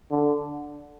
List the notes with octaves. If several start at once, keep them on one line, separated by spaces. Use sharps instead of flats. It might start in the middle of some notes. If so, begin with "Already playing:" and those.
D3